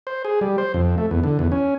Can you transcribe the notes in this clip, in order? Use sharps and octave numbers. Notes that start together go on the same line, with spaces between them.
C5
G#4
G3
C5
F2
A3
E2
D3
E2
C#4